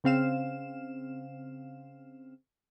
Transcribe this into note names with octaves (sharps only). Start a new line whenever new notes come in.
C#3 C4 F5 E7